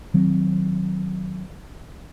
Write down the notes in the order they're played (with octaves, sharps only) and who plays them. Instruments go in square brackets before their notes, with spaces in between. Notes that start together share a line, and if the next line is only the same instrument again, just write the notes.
[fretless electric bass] D#3 F#3 C4